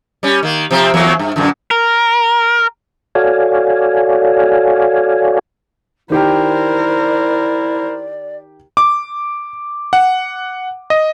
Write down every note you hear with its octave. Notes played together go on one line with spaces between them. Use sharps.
G3 C#4
D#3 A#3
C3 F3 C4
E2 F#3 A#3
G2
F#2 A#2 D3
A#4
F#4 A4 C#5 D5 F5 G#5
D#3 E4 G4 A#4 C5 D5 G5
D6
F#5
D#5